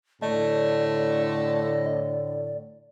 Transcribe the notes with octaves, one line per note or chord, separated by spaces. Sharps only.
A2 D3 A3 D5 D#5